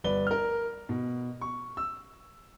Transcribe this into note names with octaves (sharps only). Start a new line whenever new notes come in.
G1 B4 D5 G7
A#4 F6
B2
C#6
E6